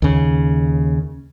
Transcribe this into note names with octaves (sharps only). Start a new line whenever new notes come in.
D#2 C#3